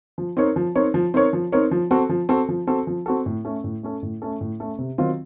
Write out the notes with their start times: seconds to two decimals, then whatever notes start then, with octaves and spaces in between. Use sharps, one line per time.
0.18 F3
0.37 C4 D#4 A#4 C#5
0.56 F3
0.75 C4 D#4 A#4 C#5
0.94 F3
1.14 C4 D#4 A#4 C#5
1.33 F3
1.52 C4 D#4 A#4 C#5
1.71 F3
1.91 C4 F#4 A4
2.09 F3
2.29 C4 F#4 A4
2.49 F3
2.67 C4 F#4 A4
2.87 F3
3.06 C4 F#4 A4
3.26 A2
3.45 A3 C#4 A4
3.64 A2
3.83 A3 C#4 A4
4.03 A2
4.22 A3 C#4 A4
4.41 A2
4.60 A3 C#4 A4
4.79 C3
4.98 D#3 F#3 C4 F4